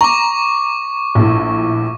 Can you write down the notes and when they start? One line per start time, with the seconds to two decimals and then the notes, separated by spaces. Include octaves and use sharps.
0.01 A#5 C#6 D6
1.15 A#1 A2